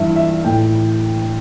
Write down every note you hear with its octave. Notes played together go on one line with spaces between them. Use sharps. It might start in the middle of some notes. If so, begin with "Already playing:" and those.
Already playing: G2 E3 E5
E5
A2 E3 G5